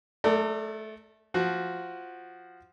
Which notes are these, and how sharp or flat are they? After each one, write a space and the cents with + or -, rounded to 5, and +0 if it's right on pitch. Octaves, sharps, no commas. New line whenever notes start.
A3 -20 A4 +45 D5 +0
F3 +0 F#4 +0